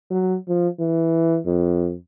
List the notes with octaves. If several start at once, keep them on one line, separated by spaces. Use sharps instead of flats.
F#3
F3
E3
F2